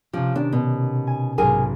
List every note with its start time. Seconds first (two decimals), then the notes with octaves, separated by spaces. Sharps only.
0.13 C3 F3 C#4 G4
0.36 D#3 D4
0.53 B2
1.07 G#5
1.38 B1 G#2 G#4 A#4 G#5